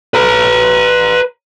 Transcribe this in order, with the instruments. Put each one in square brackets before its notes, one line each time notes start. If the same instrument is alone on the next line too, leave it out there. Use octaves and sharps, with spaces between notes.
[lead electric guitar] B4 A#5